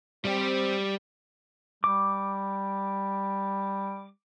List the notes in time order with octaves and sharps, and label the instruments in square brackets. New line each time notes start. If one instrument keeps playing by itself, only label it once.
[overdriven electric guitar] G3 G4 [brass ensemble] C4
[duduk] G3 [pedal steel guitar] D6